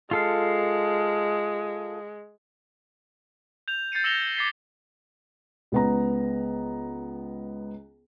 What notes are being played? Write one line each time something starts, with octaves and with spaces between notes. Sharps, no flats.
G#3 F4 A4 F5
G6 F7
G6 A6 C7 C#7 D#7
E6 A#6 C#7 E7 F7 G7
D6 G#6 A6 B6 C7 G7
C#2 B3 A#5